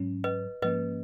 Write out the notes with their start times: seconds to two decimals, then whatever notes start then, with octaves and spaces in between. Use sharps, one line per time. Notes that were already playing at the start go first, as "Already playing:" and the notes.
Already playing: G#2 F#3 C#4
0.24 B4 D#5
0.62 G#2 F3 A#3 C#4 B4 D#5